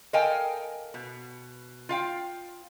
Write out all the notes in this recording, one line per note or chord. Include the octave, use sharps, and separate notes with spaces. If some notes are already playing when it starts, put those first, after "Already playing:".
A4 A#4 D#5 F5 G5 G#5
B2
F4 F5 G5